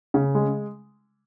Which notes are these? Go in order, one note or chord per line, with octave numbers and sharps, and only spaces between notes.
C#3
G#3